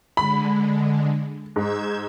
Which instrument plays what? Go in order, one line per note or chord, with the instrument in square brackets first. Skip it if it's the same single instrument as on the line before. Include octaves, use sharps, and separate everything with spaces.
[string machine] D3 G#3 [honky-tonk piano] B5
[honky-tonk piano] G#2 [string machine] E6 G6 G#6